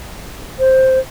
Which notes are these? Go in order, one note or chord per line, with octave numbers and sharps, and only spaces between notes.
C5